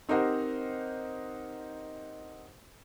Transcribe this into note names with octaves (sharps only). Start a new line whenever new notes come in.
C4 D#4 G4 A#4 C5 F#5